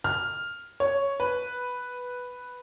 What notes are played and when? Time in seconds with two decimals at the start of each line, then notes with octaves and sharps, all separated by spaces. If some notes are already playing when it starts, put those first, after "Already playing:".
0.04 F6
0.80 C#5
1.20 B4